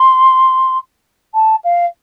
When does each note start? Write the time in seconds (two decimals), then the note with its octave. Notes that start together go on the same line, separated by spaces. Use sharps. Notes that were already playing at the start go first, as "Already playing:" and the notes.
Already playing: C6
1.34 A5
1.64 F5